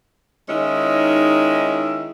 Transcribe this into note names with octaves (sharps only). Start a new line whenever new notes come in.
D#3 G#3 C#4 D#4 E4